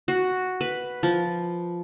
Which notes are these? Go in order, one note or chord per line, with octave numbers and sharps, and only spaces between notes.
F#4
B4
F3